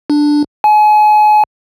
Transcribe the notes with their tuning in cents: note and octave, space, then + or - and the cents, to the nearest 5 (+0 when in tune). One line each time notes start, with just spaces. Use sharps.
D4 +5
G#5 +35